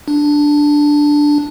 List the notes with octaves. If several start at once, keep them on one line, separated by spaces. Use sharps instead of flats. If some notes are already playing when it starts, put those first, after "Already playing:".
D4